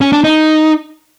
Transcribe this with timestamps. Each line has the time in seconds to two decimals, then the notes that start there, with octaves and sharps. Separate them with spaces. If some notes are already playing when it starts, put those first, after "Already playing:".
0.01 C#4
0.12 D4
0.24 D#4